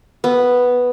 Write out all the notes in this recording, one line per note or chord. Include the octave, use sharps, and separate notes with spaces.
B3